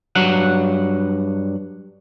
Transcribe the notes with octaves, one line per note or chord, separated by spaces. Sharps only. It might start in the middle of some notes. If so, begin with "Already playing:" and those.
G2 F#3 F#5